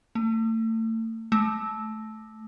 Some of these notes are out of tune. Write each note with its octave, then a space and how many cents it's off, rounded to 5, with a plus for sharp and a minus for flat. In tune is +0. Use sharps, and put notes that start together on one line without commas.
A3 +35
A3 -15